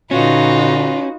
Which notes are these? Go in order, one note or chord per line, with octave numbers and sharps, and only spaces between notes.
A#2 D3 C#4 D#4 F4 F#4 B4